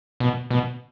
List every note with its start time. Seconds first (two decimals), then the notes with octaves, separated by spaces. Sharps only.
0.20 B2
0.50 B2